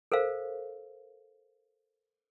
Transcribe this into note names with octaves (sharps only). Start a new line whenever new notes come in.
A4 A#4 C5 F5